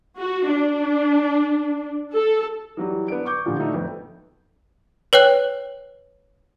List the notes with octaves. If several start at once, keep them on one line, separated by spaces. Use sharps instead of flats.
F#4
D4
A4
E3 F#3 G3
B3 D4 D7
C#6 D6 G6
A#2 D3 E3 F3 G3
A3 D4 D#4 F#4
F2 B3
B4 C#5 G5 F#6